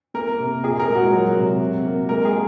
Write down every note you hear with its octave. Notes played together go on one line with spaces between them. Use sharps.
A#3 A#4
C3
A#2 G#4
A#4
G#3
F#4
F#3
C3
C3
A#3
G#3 A#4
G#4
G#3